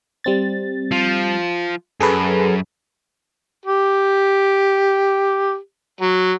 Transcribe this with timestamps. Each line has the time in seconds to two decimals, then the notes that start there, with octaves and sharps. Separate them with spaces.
0.24 G3 C4 A6
0.92 F3
2.00 F#2 G#4 A4 B4
3.65 G4
6.01 F#3